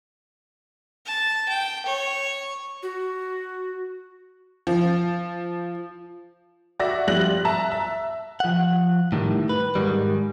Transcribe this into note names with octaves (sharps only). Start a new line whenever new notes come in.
A5
G5
C#5
F#4
F3
F#4 D5 E5 A#6
F3 G3 F#6 A#6 F#7
E5 A5 A#5
E5
F3 F#5
A2 D#3 G3
B4
G#2 D#3 G3